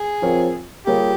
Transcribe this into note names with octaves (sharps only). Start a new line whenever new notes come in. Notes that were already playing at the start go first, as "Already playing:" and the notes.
Already playing: G#4
F3 C4 F4 A#4 C#5
G3 A#3 F4 G4 G#4 C#5